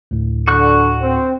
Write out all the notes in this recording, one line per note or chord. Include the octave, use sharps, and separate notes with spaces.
D2 A2
D3 F#4 C#6 F#6
C4